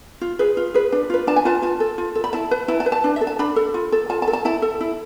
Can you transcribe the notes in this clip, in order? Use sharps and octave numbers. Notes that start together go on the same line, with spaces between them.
F4
G#4 B4
F4
G#4 B4
D4
F4 B4
D4 A5
G#5
F4 B4 A5
F4 A5
A4
F4
A4
B5
E4 A5
B4
E4 A5
A5
B4
A5
D4
E5
A4
A5
D4 B5
A4
F4
A4
F4 A5
A5
A4
A5
E4 A5
A4
E4